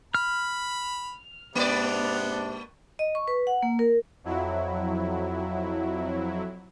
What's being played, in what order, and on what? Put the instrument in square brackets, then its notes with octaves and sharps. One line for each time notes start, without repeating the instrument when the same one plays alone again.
[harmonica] B5 [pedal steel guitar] F6
[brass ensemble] G#2 C3 D4 [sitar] A#3 D5 [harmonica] B3
[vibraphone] D#5
C#6
B4
F#5
A#3
A#4
[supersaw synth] F2 F#3 E4